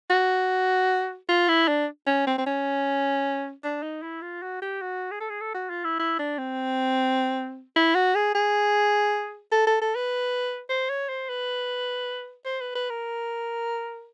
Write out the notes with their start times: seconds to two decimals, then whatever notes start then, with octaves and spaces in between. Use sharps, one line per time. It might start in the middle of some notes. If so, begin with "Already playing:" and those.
0.10 F#4
1.29 F4
1.48 E4
1.68 D4
2.07 C#4
2.27 C4
2.38 C4
2.47 C#4
3.64 D4
3.83 D#4
4.02 E4
4.22 F4
4.42 F#4
4.62 G4
4.81 F#4
5.11 G#4
5.20 A4
5.30 G#4
5.41 A4
5.54 F#4
5.70 F4
5.84 E4
5.99 E4
6.19 D4
6.38 C4
7.76 E4
7.95 F#4
8.15 G#4
8.35 G#4
9.52 A4
9.67 A4
9.81 A4
9.95 B4
10.69 C5
10.90 C#5
11.09 C5
11.29 B4
12.45 C5
12.61 B4
12.75 B4
12.90 A#4